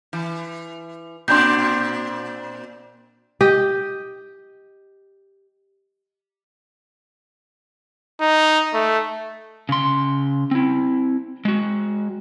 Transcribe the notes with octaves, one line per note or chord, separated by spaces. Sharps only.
E3
A#2 C4 D4 C6 G6
G4 D#5
D#4
A3
C#3 C6
C4 E4
G#3 F#4